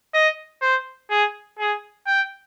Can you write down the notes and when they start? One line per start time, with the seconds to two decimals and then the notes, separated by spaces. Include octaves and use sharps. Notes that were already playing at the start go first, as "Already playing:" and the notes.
0.14 D#5
0.61 C5
1.10 G#4
1.59 G#4
2.07 G5